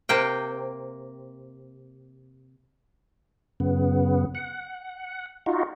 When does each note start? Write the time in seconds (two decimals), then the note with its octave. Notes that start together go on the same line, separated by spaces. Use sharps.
0.09 C3 A#3 G5
3.60 F#2 C#3 B3
4.35 F#5
5.46 D#4 F4 F#4